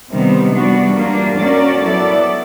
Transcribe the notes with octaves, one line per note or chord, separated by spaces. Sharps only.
C3 D#3 G3 B3
E3 G3 B3 D4 F#4
E3 G3 A#3 D4 F4
A#3 C#4 F#4 A#4 D5
F#3 B3 E4 A4 D5